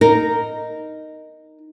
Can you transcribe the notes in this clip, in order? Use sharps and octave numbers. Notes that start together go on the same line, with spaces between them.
D#4 A#4